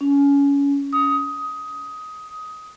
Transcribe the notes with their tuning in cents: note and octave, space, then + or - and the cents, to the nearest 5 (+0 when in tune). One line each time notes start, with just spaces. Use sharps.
C#4 +25
D#6 +15